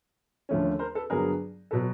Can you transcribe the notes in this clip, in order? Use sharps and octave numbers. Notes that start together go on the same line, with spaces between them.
D#2 D3 F3 A3 C#4
A#4 C5
A4 B4
G2 D3 F#3 B3 G#4 A#4
B2 F#3 A4 B4